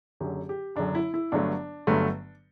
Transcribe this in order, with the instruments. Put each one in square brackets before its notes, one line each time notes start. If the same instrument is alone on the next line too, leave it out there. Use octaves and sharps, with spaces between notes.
[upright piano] F#1 F#2 D3 F#3 G4
G4
F#1 F#2 D3 F#3 D4
E4
E4
G1 G2 D3 F#3 A3 D4
G1 G2 D3 F#3 A3